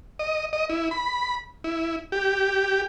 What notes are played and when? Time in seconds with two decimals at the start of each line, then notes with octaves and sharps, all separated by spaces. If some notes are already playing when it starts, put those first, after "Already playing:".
0.19 D#5
0.53 D#5
0.70 E4
0.91 B5
1.64 E4
2.12 G4